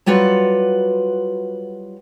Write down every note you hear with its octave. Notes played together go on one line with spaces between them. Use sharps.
F#3 G3 F4 F#4 B4